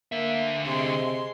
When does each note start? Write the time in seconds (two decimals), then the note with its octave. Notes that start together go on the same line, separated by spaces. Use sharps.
0.12 D3 A#3 E5
0.67 C3 G#3 C6